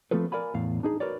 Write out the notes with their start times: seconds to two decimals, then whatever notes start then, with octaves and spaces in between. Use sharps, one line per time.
0.11 F3 A3 C4 F4 A4 B4
0.32 A#4 D5 F5 G#5 B5
0.54 E2 A2 F5
0.83 D4 D#4 G#4
1.00 F#4 A#4 B4 C#5 D5